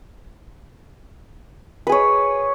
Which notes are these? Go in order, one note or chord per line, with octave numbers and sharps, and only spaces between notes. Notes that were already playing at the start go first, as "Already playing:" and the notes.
G#4 B4 C#5